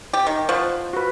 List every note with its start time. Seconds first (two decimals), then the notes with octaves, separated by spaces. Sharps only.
0.13 G4
0.27 D#3
0.49 F3 C5 F#5 C#6
0.93 F#4 B4